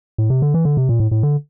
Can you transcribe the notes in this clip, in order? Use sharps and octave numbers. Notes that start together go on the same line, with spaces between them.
A2
C3
D3
E3
D3
C3
A#2
A2
A2
D3